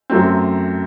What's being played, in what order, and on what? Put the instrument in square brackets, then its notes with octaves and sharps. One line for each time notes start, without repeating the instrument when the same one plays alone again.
[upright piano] F#2 F#3 A3 C4